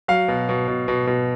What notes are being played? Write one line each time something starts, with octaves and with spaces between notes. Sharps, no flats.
F#3 F5
B2
B2
B2
B2
B2